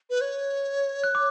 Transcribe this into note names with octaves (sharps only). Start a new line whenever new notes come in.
B4
C#5
F#6
D6